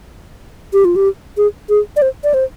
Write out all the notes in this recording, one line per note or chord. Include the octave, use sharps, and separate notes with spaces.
G4
F4
G4
G#4
G#4
D5
C5
D5
C5